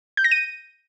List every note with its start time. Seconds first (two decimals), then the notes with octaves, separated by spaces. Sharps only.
0.17 G6
0.24 A#6
0.31 D#7